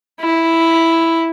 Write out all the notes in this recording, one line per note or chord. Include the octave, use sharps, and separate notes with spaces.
E4